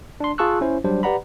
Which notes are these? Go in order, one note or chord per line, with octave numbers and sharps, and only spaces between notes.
D4 C6
F4 G#4 A5 C#6 E6 F#6
C#4 E4 C5
F#3 G3 D4 C5
G4 B4 D5 F#5 A#5 B5